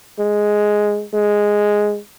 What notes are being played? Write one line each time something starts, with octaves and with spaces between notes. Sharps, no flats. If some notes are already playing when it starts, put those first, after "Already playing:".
G#3
G#3